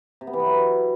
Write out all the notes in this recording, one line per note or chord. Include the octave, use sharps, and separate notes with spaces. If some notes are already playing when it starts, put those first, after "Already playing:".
C3
B3
E3
B3
F#3